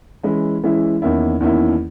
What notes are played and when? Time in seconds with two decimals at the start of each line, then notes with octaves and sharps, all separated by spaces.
0.23 E3 G#3 C#4 E4
0.63 E3 G#3 C#4 E4
1.02 E2 D#3 A#3 C#4 E4
1.40 E2 D#3 A#3 C#4 E4